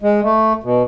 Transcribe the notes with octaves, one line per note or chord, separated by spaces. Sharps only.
G#3
A3
B2